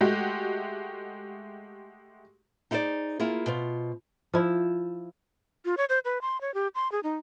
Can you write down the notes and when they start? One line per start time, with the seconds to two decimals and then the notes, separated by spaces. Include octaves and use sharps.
0.01 G#3 A3 F#4 G4
2.71 D#4 E4 G#4 C5 D5
3.20 A#3 E4 F4 G#4
3.46 B2 F4 C5
4.33 F3 E4
5.65 F4
5.77 C#5
5.89 C5
6.05 B4
6.21 C6
6.41 C#5
6.54 G4
6.75 C6
6.92 G#4
7.03 D#4